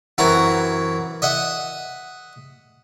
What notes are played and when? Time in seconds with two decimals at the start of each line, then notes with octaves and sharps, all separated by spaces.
0.18 F#2 E3 C4 F#4 A#5
1.22 D#5 E5 F#5